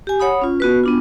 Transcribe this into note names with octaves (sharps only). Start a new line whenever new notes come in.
G4 G#5
C#5 F#5 B5 D#6
C#4 F4
B3 F#4 B4
B3 D4 F4